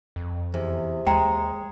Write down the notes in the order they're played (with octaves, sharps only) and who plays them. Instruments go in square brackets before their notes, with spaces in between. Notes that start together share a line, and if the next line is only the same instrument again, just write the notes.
[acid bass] F2
[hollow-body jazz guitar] E2 [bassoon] C3
[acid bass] D#2 [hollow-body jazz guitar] G#3 [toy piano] G5 A#5